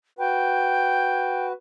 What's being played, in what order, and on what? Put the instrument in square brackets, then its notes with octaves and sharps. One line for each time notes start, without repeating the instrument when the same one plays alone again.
[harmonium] F#4 B4 [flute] G5